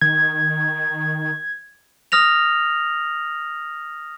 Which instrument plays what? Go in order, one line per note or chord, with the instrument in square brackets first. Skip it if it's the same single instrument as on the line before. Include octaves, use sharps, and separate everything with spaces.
[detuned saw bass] D#3 [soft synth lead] G#6
[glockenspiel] D#6 F6 A#6 F7